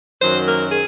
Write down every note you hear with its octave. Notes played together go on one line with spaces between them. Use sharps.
F#2 D#3 F#3 C5
A#4
G#4